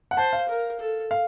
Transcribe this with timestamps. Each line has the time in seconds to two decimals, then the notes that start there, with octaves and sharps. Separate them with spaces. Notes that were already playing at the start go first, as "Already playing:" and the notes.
0.11 F#5
0.17 C5 A5
0.33 F5
0.49 A#4
0.80 A4
1.11 F5